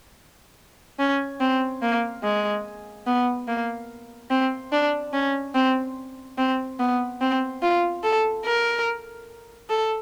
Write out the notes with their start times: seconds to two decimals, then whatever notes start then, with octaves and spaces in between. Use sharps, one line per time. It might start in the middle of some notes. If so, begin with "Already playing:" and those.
0.99 C#4
1.40 C4
1.82 A#3
2.23 G#3
3.06 B3
3.48 A#3
4.30 C4
4.72 D4
5.13 C#4
5.54 C4
6.38 C4
6.79 B3
7.21 C4
7.62 F4
8.03 A4
8.45 A#4
9.69 A4